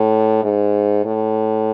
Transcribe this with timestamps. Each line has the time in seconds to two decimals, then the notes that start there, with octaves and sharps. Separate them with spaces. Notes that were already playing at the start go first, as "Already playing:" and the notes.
Already playing: A2
0.44 G#2
1.05 A2